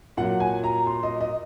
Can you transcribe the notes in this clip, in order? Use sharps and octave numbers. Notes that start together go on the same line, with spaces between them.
A#2 F#3 F#5
G#5
A#5
C6
D#5
D#5